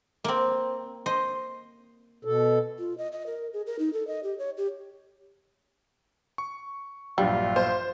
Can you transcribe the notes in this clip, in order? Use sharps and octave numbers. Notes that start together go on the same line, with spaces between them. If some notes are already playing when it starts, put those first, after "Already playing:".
A#3 C4
C5 D#5
B2 A4
F4
D#5
D#5
A#4
G#4
A#4
D#4
A4
D#5
G4
C#5
G4
C#6
A#1 G2 F#3 G3 F4
C5